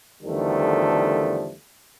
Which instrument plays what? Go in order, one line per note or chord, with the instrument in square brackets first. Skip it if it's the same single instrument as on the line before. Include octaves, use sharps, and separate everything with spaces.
[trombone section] E2 D3 D#3 F3 G3 A3